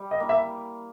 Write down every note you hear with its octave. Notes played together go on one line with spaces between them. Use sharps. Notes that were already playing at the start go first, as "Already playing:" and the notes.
Already playing: G3
D#5
A#3 E4
E5